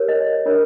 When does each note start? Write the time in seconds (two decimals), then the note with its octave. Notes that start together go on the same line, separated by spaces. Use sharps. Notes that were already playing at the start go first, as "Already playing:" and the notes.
Already playing: G4 A#4 C#5
0.09 D#5
0.45 D4 F4 A#4 C#5